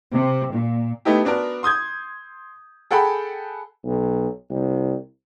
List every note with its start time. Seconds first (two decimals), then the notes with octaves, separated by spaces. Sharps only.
0.14 C3
0.54 A#2
1.05 A3 B3 D#4 E4 G4
1.25 B3 D4 F#4 A#4
1.63 C6 D#6 G6 G#6
2.91 G#4 A4 F#5 G5 B5
3.85 B1
4.50 C2